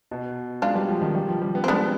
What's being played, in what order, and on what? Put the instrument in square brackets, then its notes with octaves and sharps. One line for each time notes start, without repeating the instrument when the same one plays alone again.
[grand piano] B2
[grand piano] G#3 [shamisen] D4 F4
[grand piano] G3
F3
D#3
G3
F3
G3
B3
[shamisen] C4
[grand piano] G#3 [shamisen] B3 D4